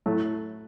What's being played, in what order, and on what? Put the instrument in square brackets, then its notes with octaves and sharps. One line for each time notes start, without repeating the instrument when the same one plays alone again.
[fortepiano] A2 F#3 A3